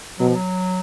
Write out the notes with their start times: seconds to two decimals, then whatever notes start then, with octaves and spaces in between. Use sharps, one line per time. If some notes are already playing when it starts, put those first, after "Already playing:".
0.19 B2 F#3
0.28 F3
0.36 F#3